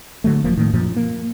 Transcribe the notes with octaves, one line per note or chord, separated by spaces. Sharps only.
D3 F#3 A3
E1 F3 A#3
A2 D#3
F#2 A#2 F3
A#3